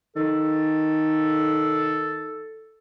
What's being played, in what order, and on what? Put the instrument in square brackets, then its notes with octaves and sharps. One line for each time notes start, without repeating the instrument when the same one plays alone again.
[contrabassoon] D#3 [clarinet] A4